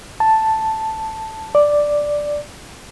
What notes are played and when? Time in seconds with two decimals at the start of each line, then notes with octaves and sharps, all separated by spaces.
0.20 A5
1.55 D5